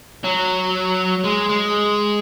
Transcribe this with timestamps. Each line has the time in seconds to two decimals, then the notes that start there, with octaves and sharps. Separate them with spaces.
0.24 F#3
1.25 G#3
1.49 G#3